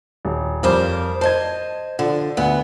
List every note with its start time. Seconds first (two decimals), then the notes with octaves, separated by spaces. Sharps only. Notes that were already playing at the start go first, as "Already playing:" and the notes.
0.25 D#1
0.63 F2 G3 A#4 C5 F5 D6
1.21 C5 D#5 A5 G#6
1.99 D3 F3 F#5
2.37 D2 B3 F#5